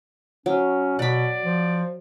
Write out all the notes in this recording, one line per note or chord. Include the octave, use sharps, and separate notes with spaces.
F#3 C#4
B2 D5 F#5 B5
F3